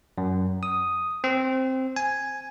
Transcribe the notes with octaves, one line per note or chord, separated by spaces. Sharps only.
F#2
D#6
C4
G#5